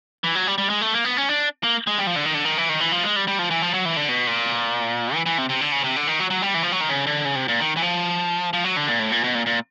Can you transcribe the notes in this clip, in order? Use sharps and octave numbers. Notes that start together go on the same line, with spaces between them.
E3
F#3
G3
G3
G#3
A3
A#3
B3
C#4
D4
A#3
G#3
G3
F3
D3
D#3
D3
D#3
E3
D#3
E3
F3
G#3
G3
G3
F3
E3
F3
F#3
E3
D3
B2
A#2
E3
E3
C3
C3
D3
C#3
C3
D3
D#3
F#3
F#3
G3
E3
F3
F#3
D#3
C#3
D3
C#3
C3
A#2
D#3
E3
F3
F3
F#3
D3
A#2
A2
A#2
B2
A#2
A#2